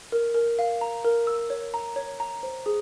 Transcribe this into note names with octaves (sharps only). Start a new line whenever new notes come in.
A#4
A#4
F5
A#5
A#4
E6
C#5
A#5
C#5
A#5
C5
G#4